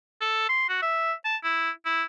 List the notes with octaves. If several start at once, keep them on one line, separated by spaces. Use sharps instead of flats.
A4
C6
F#4
E5
A5
E4
E4